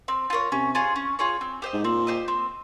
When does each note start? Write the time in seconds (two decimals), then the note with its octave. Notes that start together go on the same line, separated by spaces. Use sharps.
0.08 C4
0.30 F4 A#4 C#5
0.52 C3 C#4
0.75 F4 G#4 C#5
0.96 C#4
1.19 F4 G#4 C#5
1.41 C4
1.62 G4 C5 D#5
1.73 G#2
1.84 A#2 C4
2.07 G4 C5 D#5
2.28 C4